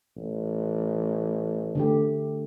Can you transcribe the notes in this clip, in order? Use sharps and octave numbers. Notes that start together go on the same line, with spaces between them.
A1
D3 A3 G4